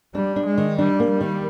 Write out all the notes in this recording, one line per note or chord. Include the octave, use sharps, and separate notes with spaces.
G3 D4
D4
G#3
D#3
G3 D4
A#3
G3
D#3